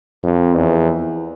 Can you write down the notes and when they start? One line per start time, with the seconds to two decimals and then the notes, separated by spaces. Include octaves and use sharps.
0.23 F2
0.55 E2